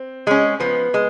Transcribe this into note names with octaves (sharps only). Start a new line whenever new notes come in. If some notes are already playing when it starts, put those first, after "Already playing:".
Already playing: C4
G#3 C#4
F3 B3
G#3